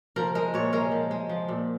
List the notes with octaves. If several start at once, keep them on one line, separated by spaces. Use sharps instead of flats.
F3 A#4
G#3 A#4
A#2 C#5
G#3 A#4
F3
G#3
F3
A#2